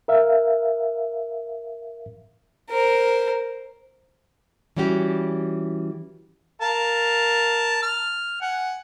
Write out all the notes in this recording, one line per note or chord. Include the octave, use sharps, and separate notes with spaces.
A#4 E5 F5
A#4 C5
E3 G3 C#4 F#4 G4
A#4 F5 A5
F6
F#5 G#5